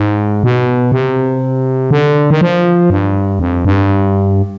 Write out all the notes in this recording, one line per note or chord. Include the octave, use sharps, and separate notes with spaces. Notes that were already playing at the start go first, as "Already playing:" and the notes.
Already playing: G#2
B2
C3
D3
D#3
F3
G2
F2
G2